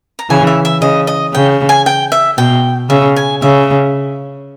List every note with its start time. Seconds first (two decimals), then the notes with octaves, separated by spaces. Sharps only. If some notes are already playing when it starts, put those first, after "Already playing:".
0.19 A#5
0.30 C#3 E3 G#5
0.47 E5
0.65 E5
0.81 C#3 D#5
1.07 D#5
1.33 C#3 G5
1.69 G#5
1.86 G5
2.12 E5
2.38 B2 G5
2.90 C#3 E5
3.16 G#5
3.42 C#3 E5